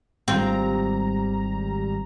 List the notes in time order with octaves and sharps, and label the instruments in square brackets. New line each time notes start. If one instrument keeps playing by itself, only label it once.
[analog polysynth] G#1 G3 A#5 [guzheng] C4 F4